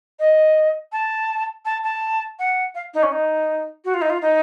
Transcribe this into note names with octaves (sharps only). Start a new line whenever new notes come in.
D#5
A5
A5
A5
F#5
F5
D#4
C#4
D#4
F#4
F4
D#4
F4
D#4